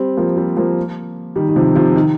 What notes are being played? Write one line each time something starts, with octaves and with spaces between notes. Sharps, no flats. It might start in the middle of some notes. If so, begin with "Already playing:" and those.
Already playing: G3 C4
F3 A#3
G3 C4
F3 A#3
D#3 G3
D#3
C3 F3
C3 F3
D#3